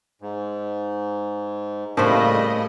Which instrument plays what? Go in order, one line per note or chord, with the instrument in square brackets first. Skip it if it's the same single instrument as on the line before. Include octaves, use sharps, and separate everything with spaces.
[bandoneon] G#2
[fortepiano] A2 [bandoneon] C#3 G3 B5 [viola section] A3 D#5 [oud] A#3 C5